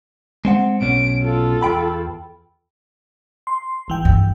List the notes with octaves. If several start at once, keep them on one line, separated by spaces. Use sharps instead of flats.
G#3 C4 F#5
B1 B2 C#4 D7
F4 A4
E2 G5 B5
C6
G#1 E3 G5
G2